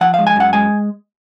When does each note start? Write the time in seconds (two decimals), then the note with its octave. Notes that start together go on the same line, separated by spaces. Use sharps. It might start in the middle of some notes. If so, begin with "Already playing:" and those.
0.01 F3 F#5
0.14 G#3 F5
0.27 G#5
0.36 F#2 F#5
0.53 G#3 G#5